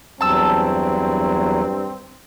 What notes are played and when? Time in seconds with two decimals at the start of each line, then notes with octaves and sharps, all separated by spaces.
0.21 E2 G2 F#3 C4 A5 E6